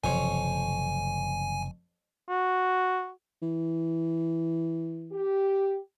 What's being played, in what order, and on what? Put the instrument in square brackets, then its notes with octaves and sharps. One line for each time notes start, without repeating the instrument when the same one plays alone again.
[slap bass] F#1 C3 E3 [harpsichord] F2 F3 C#5 [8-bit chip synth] G#5
[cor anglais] F#4
[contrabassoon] E3
[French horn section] G4